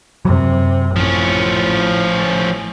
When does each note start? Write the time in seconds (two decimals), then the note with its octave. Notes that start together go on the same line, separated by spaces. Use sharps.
0.25 F#2 C3 F#3
0.96 A1 F3 C#4